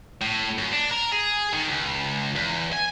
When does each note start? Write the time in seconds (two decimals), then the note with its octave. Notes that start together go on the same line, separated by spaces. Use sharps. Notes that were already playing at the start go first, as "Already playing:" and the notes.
0.21 A2
0.58 F#2
0.72 D4
0.91 A#4
1.12 G#4
1.53 D#3
1.68 C#2
2.36 E2
2.73 G#5